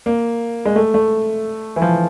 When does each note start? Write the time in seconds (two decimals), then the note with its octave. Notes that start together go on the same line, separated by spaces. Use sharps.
0.06 A#3
0.65 G#3
0.76 A3
0.94 A3
1.76 E3
1.82 F3